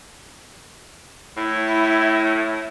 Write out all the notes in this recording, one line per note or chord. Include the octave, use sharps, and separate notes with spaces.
A2 E4